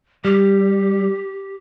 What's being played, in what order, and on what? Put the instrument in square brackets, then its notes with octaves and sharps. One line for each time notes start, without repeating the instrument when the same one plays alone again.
[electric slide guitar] G3 [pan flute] G4